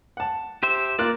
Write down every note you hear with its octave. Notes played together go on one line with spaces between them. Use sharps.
F#5 A5
G4 C5 E5
A#3 F4 D5 F#6